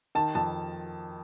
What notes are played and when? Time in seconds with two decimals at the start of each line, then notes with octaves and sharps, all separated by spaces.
0.15 D#3 A5
0.35 F2 A5